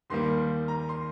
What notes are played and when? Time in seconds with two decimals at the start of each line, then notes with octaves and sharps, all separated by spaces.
0.10 D#2 D#3 G3 A#3 C6
0.68 A#5
0.89 C6